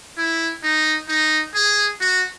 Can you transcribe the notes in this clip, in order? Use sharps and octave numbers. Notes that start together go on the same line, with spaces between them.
E4
D#4
D#4
G#4
F#4